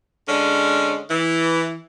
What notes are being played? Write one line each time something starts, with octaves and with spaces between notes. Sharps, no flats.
D3 G#3 C#4
E3